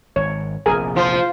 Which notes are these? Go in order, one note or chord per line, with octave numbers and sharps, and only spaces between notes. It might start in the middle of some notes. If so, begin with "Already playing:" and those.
G#1 C#5
F1 A#1 G#4 A#4 G#5
F3 F4 C5